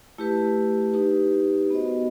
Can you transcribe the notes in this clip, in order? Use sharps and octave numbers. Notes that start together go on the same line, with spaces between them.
A3 E4 G4 B4
D#4 G4 B4
B3 F#4 C5 D#5